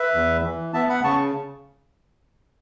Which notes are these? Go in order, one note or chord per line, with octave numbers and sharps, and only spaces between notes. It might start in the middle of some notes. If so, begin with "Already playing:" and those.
Already playing: B4 E5
E2
E3
B3 E5 A5
F#5 B5
C#3 A5 C#6